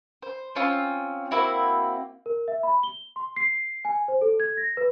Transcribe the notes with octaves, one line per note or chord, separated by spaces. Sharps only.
C5
C4 C#4 F4
A#3 C4 E4 F#4
A#4
E5
B5
G7
C6
C7
G#5
C5
A4
G#6
A#6
B4